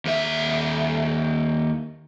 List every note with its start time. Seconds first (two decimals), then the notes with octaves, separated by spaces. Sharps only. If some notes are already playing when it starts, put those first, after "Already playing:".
0.05 D#2 E5